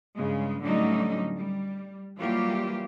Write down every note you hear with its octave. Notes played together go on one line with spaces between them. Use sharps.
G2 C#3 G#3
A2 D3 F#3 G3 C#4 D#4
G3
E3 F#3 G3 A#3 F4 G4